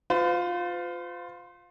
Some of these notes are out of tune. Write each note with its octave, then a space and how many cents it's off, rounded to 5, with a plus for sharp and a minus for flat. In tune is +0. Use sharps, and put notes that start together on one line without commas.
F4 +15 C5 -45